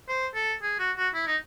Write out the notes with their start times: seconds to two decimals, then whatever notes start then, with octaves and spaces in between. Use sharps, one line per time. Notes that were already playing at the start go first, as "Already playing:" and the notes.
0.09 C5
0.35 A4
0.62 G#4
0.79 F#4
0.96 F#4
1.14 E4
1.27 D#4